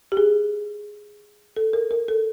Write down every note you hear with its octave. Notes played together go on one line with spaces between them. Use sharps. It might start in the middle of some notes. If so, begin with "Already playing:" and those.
G4
G#4
A4
A#4
A#4
A4